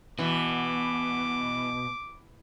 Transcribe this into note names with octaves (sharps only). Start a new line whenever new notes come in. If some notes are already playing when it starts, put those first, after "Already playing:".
B2 E3 D6